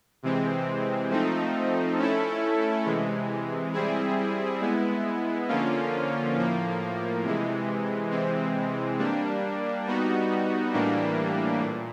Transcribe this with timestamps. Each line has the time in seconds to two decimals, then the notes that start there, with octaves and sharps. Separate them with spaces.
0.23 C3 E3 G#3 C4
1.10 F3 A3 C4 D#4
1.97 A3 C#4 E4 A4
2.85 C3 E3 G#3
3.73 G3 C4 E4 G#4
4.61 G#3 B3 E4
5.48 D3 F3 A#3 C#4 F4
6.35 A2 F3 A#3
7.23 C3 E3 G#3
8.11 C3 E3 G#3 C4
8.99 G3 A#3 D4
9.86 G3 B3 D#4 F#4
10.73 A2 E3 G3 A#3 D4
11.61 A#2